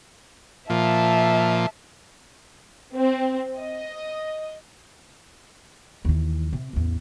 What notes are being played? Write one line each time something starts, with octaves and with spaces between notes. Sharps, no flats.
A#2 F3 E5 A5
C4
D#5
D#2 E3
C3
A1 E2